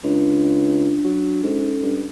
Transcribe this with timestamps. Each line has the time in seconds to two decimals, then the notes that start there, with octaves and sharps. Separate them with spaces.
0.04 C#2 D4
1.04 F#3
1.43 G#2 C#4 A4
1.82 G2